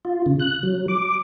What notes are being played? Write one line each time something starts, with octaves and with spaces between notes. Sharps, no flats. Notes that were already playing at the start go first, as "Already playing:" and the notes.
F4
C#3
F#6
F#3
D6